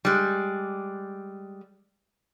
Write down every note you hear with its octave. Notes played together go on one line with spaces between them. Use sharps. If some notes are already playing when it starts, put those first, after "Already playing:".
G3 G#3